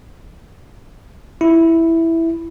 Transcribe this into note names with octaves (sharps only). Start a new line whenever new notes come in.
E4